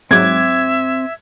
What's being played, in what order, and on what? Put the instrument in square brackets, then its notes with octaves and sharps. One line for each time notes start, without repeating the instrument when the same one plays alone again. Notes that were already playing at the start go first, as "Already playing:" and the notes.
[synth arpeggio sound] G#2 F#3 [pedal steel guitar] C4 D6 F#6 [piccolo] E5 [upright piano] G#6